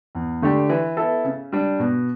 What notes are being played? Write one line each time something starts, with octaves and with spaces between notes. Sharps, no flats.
E2
D3 A3 D4 G4
E3
B3 E4 A4
C#3
G3 D4
B2